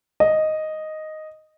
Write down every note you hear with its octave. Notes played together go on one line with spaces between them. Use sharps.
D#5